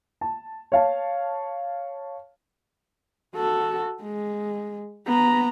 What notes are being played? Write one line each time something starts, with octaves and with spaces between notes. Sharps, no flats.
A5
C#5 F5 A5
F#4 A4
G#3
B3 A#5